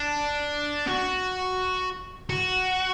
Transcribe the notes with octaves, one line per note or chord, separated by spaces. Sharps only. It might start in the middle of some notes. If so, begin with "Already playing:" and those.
Already playing: D4
F#4
F#4